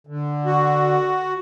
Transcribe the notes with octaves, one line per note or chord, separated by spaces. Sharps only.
D3
F#4